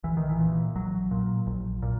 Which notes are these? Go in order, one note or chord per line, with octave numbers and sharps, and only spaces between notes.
A#1 E3
D#3
E3
A#2
A#1 F#3
A#2
A#1
A#2